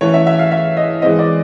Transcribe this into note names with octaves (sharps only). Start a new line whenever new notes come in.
E3 A3 C#4 C#5
E5
E5
F5
E5
D#5
E3 G#3 C4 D#5
D5